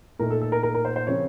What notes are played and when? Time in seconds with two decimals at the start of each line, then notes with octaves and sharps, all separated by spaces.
0.19 A#2 A3 D#4 A#4
0.31 A4
0.42 A4
0.52 A#4
0.63 A#4
0.74 A#4
0.85 C5
0.96 C5
1.07 C#3 F3 C4 C#5